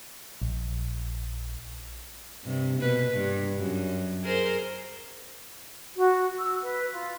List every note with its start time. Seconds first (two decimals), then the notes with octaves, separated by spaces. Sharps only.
0.42 A#1
2.44 G2 C3
2.79 B2 A#3 B4
3.13 G2
3.59 F#2
4.23 G#4 A#4 C5
5.96 F#4
6.40 E6
6.63 B4
6.94 F4